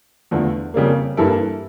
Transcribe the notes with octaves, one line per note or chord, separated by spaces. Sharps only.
E2 D3 F3 A3
F2 C#3 G3 A#3
G2 E3 A#3 E4 A4